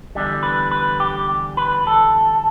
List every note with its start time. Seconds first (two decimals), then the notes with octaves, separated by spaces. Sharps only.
0.15 E2 D3 G3
0.43 B4
0.71 B4
1.00 G4
1.57 B4
1.87 A4